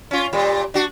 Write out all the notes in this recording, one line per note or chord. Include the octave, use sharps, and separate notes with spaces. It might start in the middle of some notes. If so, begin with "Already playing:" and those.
C#4 F4
A#2 G3
D4 F#4